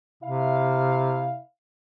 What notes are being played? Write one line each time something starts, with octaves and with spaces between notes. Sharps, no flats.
C3 E4 F5